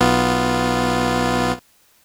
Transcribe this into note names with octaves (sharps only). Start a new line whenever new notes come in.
B1 B3 F4